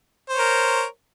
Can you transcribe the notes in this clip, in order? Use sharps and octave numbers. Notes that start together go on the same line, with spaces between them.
A#4 C5 C#5